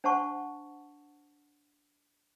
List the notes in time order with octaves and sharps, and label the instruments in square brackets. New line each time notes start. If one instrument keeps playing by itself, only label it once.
[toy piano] D4 C5 F#5 A5 C#6